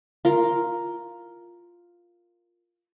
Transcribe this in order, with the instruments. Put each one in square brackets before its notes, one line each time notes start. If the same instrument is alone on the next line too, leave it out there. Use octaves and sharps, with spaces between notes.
[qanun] F4 A#4